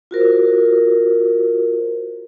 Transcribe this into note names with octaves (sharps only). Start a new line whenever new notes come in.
F4 F#4 A#4 C5